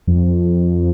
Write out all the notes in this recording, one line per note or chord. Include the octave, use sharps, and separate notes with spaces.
F2